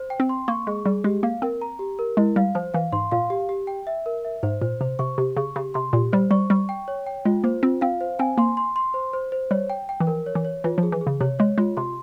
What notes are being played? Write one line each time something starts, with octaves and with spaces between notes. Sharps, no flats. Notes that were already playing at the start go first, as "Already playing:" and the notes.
Already playing: C5
G5
C4
C6
A#3 C#6
G#3 G#4
G3 G#4
G#3 G4
A#3 F5
C4 A#4
A#5
G4
A#4
G#3 E4
G3 F5
F3 C5
E3 F5
G#2 C6
A#2 F5
G4
G4
G5
E5
A#4
E5
G#2 C5
A#2 C5
C3 C5
C3 C#6
C3 G4
C#3 C#6
C#3 G4
C3 C6
A#2 G4
G3 C5
G3 C#6
G3 C#6
G5
C#5
G5
G#3 F4
A#3 C5
C4 F4
C4 F5
C5
C4 G#5
A#3 C6
C6
C6
C5
C5
C5
G3 C#5
G5
G5
E3
F3 A#4
C#5
E3
C#5
E3 F4
F3
G#4
E3
G#4
C#3
C3 C#5
G#3 C#5
G#3 F4
C3 C6